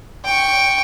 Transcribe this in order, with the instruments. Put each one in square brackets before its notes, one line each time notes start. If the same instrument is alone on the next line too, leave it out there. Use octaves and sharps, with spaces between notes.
[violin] G5 C#6